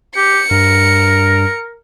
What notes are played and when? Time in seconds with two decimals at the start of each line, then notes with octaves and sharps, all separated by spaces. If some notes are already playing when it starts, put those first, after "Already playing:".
0.16 G4 C#7
0.51 G2 A#4